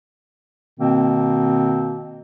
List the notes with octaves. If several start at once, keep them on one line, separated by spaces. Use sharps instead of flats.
B2 D#3 A#3 C4